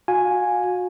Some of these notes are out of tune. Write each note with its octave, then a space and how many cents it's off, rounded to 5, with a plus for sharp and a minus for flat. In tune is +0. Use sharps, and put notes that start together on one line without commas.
F#4 -30 F5 +30 G#5 +0